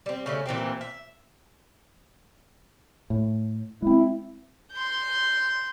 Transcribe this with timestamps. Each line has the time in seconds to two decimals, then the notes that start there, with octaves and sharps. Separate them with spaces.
0.06 G3 C4
0.26 C#3 A3 C#4
0.46 A#2 E3 C4 G4
0.81 E5
3.10 A2
3.82 G#3 C4 E4
4.74 C6 G6